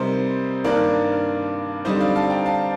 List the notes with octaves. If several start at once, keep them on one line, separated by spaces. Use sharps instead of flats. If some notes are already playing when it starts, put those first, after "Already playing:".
Already playing: C3 G3 C4 D#4 A#4 C5
G2 D#3 A#3 D4 A#4 D5
D3 G3 C4 D#4 C5 D#5
D5 F5
F5 A5
G5 A#5
F5 A5